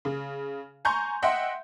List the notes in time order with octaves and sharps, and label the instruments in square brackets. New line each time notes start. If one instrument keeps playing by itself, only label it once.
[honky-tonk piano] C#3
G#5 A#5 C6 C#6 G6
D#5 E5 F#5 G5 C6